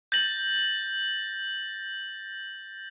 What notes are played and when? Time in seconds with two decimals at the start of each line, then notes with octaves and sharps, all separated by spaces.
0.12 G6 A6 A#6 F#7